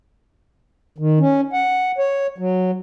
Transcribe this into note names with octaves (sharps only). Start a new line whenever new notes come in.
D#3
C#4
F#5
C#5
F#3